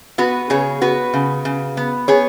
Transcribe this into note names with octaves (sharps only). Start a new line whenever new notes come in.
B3 F#4 B4
C#3 G#4 C#5
B3 F#4 B4
C#3
C#3
B3
B3 G#4 C#5